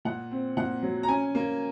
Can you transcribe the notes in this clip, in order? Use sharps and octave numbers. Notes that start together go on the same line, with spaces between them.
A#2 F#5
C4
A#2 F#5
F#3
A#5
C#4 G#5
A#3